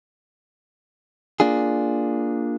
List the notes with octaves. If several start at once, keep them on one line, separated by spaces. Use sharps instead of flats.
A#3 D4 F4 G#4